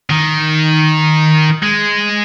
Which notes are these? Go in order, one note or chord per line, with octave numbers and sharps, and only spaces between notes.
D#3
G#3